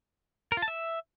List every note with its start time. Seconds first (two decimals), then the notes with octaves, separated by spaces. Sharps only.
0.52 A#4
0.57 F4
0.62 A5
0.68 E5